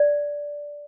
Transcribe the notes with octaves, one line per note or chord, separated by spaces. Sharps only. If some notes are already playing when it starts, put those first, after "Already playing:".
Already playing: D5